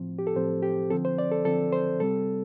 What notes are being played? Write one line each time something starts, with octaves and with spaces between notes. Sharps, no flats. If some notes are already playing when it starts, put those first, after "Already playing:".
Already playing: A2 F3 C4
G4
A4
A2 F3 C4 C5
G4
D3 F3 C4 A4
C5
D5
A4
D3 F3 C4 A4
C5
C3 G3 C4 A4